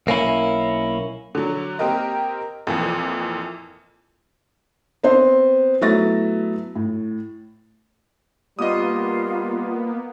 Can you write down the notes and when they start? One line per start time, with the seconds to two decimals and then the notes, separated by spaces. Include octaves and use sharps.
0.07 B1 A#3 C#4 E4
1.35 D3 F#3
1.79 A#3 C4 G4 A#4 D#5
2.67 F2 A#2 E3
5.04 B3 C4 C5
5.81 F#3 A3 B3 E4 A6 A#6
6.76 A2
8.59 G3 A#3 B3 F4 D#5 D#6